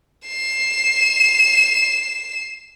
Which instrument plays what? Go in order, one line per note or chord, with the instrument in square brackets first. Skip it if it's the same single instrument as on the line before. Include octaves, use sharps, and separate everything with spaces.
[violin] C7 E7